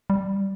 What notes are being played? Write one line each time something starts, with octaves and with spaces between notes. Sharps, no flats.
G3